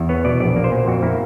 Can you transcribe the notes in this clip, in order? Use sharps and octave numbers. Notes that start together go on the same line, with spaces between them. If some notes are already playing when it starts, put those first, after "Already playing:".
Already playing: E2
B3 C#5
B2 D5
A#1 D5
A#3
C5
A#2
F2 F#4
A#3 E4